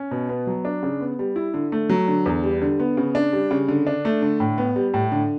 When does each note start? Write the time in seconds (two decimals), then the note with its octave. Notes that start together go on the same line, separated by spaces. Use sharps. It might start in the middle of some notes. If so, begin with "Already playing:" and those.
Already playing: C#4
0.11 B2
0.29 B3
0.47 F#3
0.65 D4
0.83 C#3
1.01 B3
1.19 G3
1.36 E4
1.54 D3
1.72 A3
1.89 F#3
2.08 D3
2.26 E2
2.43 G3
2.62 D3
2.80 B3
2.97 C#3
3.15 D4
3.33 G3
3.51 C#3
3.68 D3
3.87 D4
4.05 A3
4.22 D3
4.40 A2
4.58 B3
4.76 G3
4.94 A2
5.12 D3